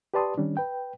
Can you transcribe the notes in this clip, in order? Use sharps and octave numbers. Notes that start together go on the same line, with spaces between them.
G4 B4 D5 A5 C6 D#6
D#3 G3 C#4 D4
B4 G5